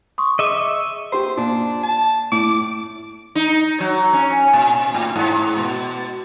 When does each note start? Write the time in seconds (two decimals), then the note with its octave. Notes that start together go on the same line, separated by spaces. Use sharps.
0.18 C6 C#6 D#6
0.39 G#4 D#5 E5 C#6 D6
1.13 G4 C5 C6
1.37 A#2 D4
1.83 A5
2.32 A2 D6
3.35 D#4
3.80 F#3
4.13 C#4
4.53 A#2
4.94 A2
5.16 G#2
5.58 B2